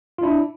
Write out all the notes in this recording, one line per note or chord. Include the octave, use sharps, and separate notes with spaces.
F4
D4 E4